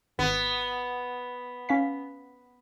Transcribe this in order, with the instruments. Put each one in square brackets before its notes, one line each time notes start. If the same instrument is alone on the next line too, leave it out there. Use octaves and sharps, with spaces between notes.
[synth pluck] G#1 [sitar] B3
[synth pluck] C#4 F5 B6